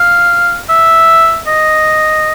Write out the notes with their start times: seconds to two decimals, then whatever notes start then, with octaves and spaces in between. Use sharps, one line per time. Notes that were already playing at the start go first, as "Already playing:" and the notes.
Already playing: F5
0.69 E5
1.47 D#5